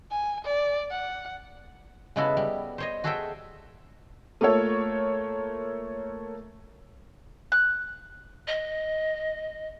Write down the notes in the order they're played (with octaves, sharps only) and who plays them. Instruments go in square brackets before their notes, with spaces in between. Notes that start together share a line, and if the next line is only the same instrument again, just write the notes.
[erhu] G#5
D5
F#5
[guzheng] C#3 G#3 B3 E4 F#4 A4
G3
C5 C#5 D#5
F#4 G#4 A4 C#5 E5 G5
[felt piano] A3 A#3 F4 A4 C#5
[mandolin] F#6
[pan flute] D#5